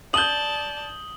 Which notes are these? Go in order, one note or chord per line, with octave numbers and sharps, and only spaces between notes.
D5 A5 D#6 G6 F#7 G7